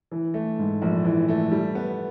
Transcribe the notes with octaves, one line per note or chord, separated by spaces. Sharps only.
E3
A3
G#2
A#1
E3
A3
G3
B3